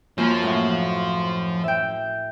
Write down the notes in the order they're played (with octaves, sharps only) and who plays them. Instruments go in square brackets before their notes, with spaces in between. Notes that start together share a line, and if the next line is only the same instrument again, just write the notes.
[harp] F#2 A#3 G#5 [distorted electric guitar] F3
[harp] A2 F#3
E5 G5